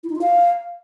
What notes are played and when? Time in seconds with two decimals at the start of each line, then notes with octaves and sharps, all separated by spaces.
0.04 E4
0.09 D#4
0.15 F4
0.21 F5